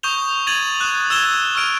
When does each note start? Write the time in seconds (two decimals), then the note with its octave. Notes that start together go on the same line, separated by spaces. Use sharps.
0.03 C#6 D#6 G6 E7 F7 G7
0.47 G#6 A6 D#7 F7 F#7
0.80 D#6 F#6 E7 F#7
1.10 E6 G#6 E7 G7
1.55 C#6 E6 F6 D7 D#7 F7